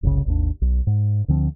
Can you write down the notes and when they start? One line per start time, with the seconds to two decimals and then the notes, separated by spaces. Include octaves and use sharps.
0.03 F#1 C2 A2 C#3
0.26 G#1 D#2 D4
0.62 B1
0.87 G#2
1.28 D2 D3 F3 C4